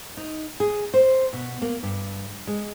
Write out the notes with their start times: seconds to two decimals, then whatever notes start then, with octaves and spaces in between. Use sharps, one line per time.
0.17 D#4
0.60 G#4
0.94 C5
1.33 B2
1.62 A#3
1.83 G2
2.47 G#3